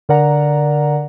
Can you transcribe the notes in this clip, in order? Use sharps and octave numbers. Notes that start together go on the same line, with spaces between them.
D3 A#4 D5 F#5 A#5